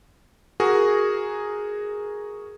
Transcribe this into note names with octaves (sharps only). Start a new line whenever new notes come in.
F#4 G#4 A#4